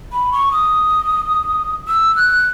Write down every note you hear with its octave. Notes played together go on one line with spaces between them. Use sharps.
B5
C#6
D#6
E6
F#6